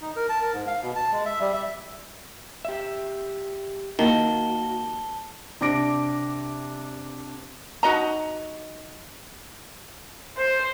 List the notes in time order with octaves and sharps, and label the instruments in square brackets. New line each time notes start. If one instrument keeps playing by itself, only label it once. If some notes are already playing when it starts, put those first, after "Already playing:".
[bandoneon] D#4
A#4
A5
A#4
G#2
F5
B2
A5
G#3
E5
G3
E5
[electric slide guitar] G4 E5
[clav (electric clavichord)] D#3 [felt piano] A#3 [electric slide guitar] F#4 [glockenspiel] A5 G7
[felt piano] C3 D4 D6 A#6 D7
[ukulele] D#4 F#4 D#5 A#5
[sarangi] C5